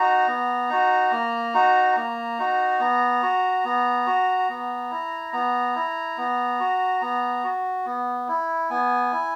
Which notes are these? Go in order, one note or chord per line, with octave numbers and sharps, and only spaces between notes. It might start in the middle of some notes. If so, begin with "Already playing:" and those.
Already playing: D#4 F#4 A#5
B3
D#4 F#4
A#3
D#4 F#4
A#3 A#5
D#4 F#4
B3
F#4
B3
F#4
B3
E4
B3 A#5
E4
B3
F#4
B3 A#5
F#4
B3
E4
B3 G#5
E4